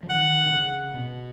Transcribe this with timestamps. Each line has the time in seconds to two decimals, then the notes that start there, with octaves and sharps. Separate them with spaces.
0.03 F3
0.10 D#3 F#5
0.46 D#3
0.52 C#3
0.94 B2